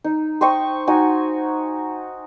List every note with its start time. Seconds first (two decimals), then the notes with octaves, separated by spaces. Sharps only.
0.04 D#4
0.41 C5 D#5 G5 C#6
0.87 D#4 F#4 G#5